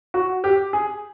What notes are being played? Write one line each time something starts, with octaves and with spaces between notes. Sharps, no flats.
F#4
G4
G#4